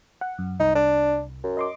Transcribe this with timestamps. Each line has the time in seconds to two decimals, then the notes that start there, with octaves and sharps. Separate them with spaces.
0.21 F#5
0.38 F#2
0.60 C2 D#4
0.75 D4
1.44 F#2
1.57 D#5 C6 D6